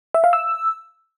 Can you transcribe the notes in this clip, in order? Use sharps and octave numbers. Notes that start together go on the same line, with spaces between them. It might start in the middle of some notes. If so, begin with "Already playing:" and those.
E5
F5
E6